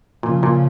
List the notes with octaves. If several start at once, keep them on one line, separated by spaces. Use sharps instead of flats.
A#2 C#3 F3
A#2